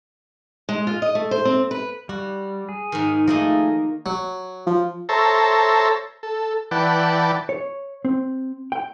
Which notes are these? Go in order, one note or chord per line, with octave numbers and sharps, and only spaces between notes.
G#3
F4
D#5
A3
C5
C4
B4
G3 F#4
G#4
G#2 D#3
F3 A3 A#3 D#4 G#4 D#5
F#3
F3
A4 C5 C#5 E5 A5 A#5
A4
E3 B4 D5 F#5 G5 A5
C#5
C4
G5